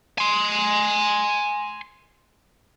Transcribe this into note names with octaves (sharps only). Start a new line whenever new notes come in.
G#5 C6